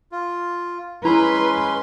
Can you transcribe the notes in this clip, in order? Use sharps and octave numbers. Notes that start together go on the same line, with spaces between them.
F4
G#3 C#4 E4 B4 A#5 C6